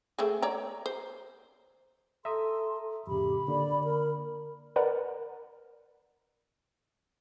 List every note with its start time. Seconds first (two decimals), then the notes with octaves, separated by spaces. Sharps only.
0.18 A3 C4 G#4
0.42 C#5 D5 A#5
0.86 C5
2.25 A4 E5 A#5 C6 D#6
3.07 F2 A2 C#3 G4 B5
3.48 D3 A#3 D5
3.84 A#4
4.76 A#4 B4 D5 F#5 A#5 B5